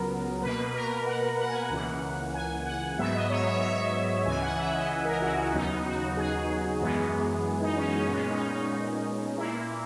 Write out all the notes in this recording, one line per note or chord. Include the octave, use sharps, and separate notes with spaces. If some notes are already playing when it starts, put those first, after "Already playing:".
Already playing: C#2 C#3 F#3 B3 A#4
B2 A#3 B4
A#4
F#5
F#5
G#5
C#2 C#3 E3 A#3 F#5
G#5
F#5
G#2 F#3 B3 E5
D#5
C#5
E5
E5
C#2 C#3 E3 G#5
F#5
E5
D#5
A#4
F#4
E4
D#2 C#3 F#3 B3 D#4
F#4
G#4
F#2 E3 G#3 B3
D#4
C#4
D#4
A#2 G#3 B3 C#4
D#4
D#4
A#2 A#3 E4